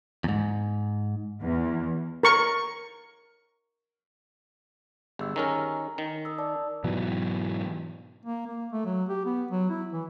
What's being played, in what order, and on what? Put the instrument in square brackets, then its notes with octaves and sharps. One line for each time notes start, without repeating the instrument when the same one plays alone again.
[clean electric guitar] E2 G#2
[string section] E2
[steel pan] A#4 C#6
[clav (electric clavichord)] G1 [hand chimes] G4 G#4 E6
[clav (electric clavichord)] D#3 C#4 A#4 [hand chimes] G#5 A#5
[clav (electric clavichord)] D#3 [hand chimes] G#5
[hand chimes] A#4 D#6 E6
D5 A5 D6
[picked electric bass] G#2 B2 E3 F#3
[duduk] A#3
A#3
A3
F#3
G4
B3
F#3
E4
E3